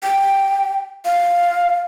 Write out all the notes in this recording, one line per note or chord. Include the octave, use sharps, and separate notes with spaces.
G5
F5